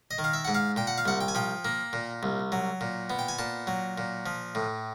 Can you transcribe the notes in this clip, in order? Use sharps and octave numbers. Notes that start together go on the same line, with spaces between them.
D#5
D#3
F5
E5
G#2 F#5
F5
A#2 G5
F#5
F5
C2 F#5
G5
G#5
F3 G5
A#3
A#2
C2
F#3
A#2
B3
G5
G#5
A#2 A5
F#3
A#2
F3
A2